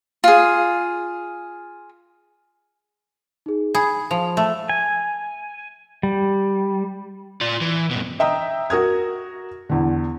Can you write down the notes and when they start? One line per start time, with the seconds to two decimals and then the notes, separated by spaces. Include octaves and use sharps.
0.24 F4 G#4
3.46 D#4 G#4
3.75 G#4 B5
4.11 F3 F7
4.37 A3
4.70 G#5
6.03 G3
7.41 F4 D5
7.61 E3
7.91 G2 B2
8.19 D#5 E5 G5 A#5 D#6
8.70 F#4 A#4 D#6 G#6
9.69 E2 D3